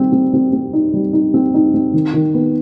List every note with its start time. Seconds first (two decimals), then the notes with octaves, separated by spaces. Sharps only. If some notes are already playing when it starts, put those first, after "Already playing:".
Already playing: D#3 G3 C4
0.12 C4
0.34 C4
0.53 C4
0.73 D#4
0.93 G3
1.13 D#4
1.34 C4
1.54 D#4
1.74 C4
1.93 D#3
2.13 D#3
2.34 B3